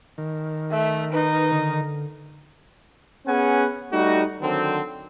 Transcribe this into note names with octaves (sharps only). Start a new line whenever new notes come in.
D#3
A3 E5
D#4 B4
D3
B3 C#4 G#4 F#5 G#5
G3 A3 D#4 F#4
D3 D#3 F#3 C4